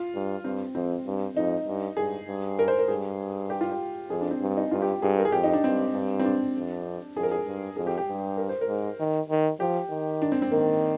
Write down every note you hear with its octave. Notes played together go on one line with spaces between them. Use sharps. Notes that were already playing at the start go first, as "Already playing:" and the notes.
Already playing: F4
G2
G2 C4
F2 C4
G2
F2 D#4
G2
G2 G#4
G2
A#4
C5
A#4
G2 G#4
G4
F4
G4
F2 G#4
D4
C4
G2
D#4
G2 F4
G4
G2 G#4
A#4
G#4
F2 G4
D#4
D4
G2 C4
G2
C4
D4
F2
F2 G#4
A#4
G#4
G2
F2 G#4
G4
G4
G2
A#4
C5
A#4
G#2
D#3
D#3
F3 G4
D#3
D4
C4
C4
D#3 A#3